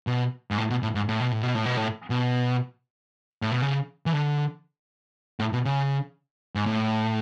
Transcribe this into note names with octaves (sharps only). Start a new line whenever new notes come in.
B2
G#2
A2
B2
A2
G#2
A2
B2
A2
B2
A2
B2
A2
B2
A2
B2
C#3
E3
D3
A2
B2
C#3
G#2
A2